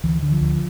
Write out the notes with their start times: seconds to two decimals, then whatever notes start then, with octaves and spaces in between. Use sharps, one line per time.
0.04 D2 E3
0.23 D3
0.32 F3
0.41 D2